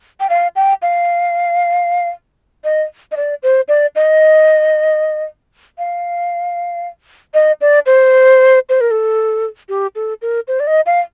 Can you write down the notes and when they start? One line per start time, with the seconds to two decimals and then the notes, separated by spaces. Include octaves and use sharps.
0.20 G5
0.30 F5
0.56 G5
0.82 F5
2.64 D#5
3.12 D#5
3.17 D5
3.43 C5
3.68 D5
3.96 D#5
5.78 F5
7.34 D#5
7.61 D5
7.86 C5
8.69 C5
8.81 A#4
8.91 A4
9.69 G4
9.95 A4
10.22 A#4
10.48 C5
10.60 D5
10.67 D#5
10.86 F5